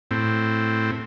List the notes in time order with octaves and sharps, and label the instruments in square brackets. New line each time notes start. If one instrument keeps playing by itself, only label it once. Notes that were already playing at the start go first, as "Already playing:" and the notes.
[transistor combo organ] A2 C4